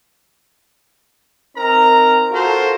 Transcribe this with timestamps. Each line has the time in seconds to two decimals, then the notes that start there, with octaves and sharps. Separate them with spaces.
1.56 C4 D#4 A#4 A#5
2.31 F4 F#4 A4 A#4 C5